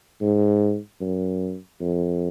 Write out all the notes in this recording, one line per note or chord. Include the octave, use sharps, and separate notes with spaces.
G#2
F#2
F2